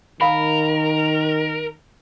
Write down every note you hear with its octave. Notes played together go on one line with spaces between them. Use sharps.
D#3 A#4 F5 B5